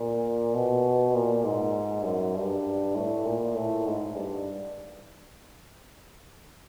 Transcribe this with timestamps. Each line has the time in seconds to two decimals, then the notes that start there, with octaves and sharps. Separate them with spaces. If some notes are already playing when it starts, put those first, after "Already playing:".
Already playing: A#2
0.54 B2
1.15 A#2
1.44 G#2
2.04 F#2
2.35 G2
2.95 A2
3.25 A#2
3.56 A2
3.86 G#2
4.15 G2